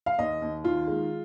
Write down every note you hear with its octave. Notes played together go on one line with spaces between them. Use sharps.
F5
D#2 D#5
D#2
D#3 F4
G#3